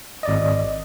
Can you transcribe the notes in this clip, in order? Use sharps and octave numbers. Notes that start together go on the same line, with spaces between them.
G#1 D5 D#5